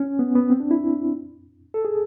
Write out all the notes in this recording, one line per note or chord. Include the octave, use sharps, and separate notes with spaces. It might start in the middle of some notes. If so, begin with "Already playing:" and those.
Already playing: C#4
B3
B3
C4
D4
E4
A4
G#4